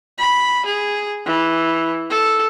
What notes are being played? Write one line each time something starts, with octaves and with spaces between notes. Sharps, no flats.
B5
G#4
E3
A4